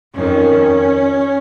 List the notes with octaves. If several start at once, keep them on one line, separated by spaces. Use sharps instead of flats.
F2 D#3 C#4